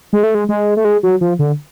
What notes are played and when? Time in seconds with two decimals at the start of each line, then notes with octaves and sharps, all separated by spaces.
0.13 G#3
0.23 A3
0.35 G#3
0.49 G#3
0.77 A3
0.85 G#3
1.03 F#3
1.21 F3
1.39 D3